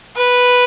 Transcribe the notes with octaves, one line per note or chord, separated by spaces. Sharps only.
B4